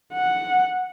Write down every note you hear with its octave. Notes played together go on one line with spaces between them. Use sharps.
F#5